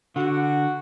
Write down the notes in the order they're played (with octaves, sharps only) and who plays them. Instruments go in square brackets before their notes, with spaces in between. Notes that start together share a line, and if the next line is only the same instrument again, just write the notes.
[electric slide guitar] D3 [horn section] F#4